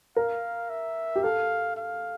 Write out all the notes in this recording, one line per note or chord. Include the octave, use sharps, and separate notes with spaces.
A#4 F5
E5
G4
A4 F5
F5